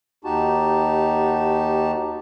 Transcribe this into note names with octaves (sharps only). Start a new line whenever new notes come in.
D#2 D#4 F#4 G4 A5